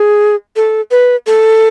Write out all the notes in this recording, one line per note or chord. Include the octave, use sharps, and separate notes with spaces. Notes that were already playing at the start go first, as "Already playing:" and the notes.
Already playing: G#4
A4
B4
A4